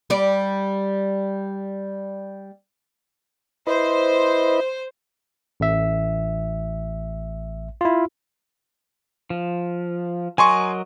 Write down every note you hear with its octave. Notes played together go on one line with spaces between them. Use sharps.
G3 D5
E4 B4 C5 D#5
A1 E5
E4 F4
F3
F#3 A#4 D#5 G#5 C6 C#6